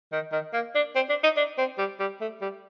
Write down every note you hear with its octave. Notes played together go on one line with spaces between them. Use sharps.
D#3
D#3
A#3
D4
C4
D4
D#4
D4
C4
G3
G3
A3
G3